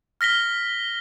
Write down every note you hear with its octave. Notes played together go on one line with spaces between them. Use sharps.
F6 A#6 B6 G7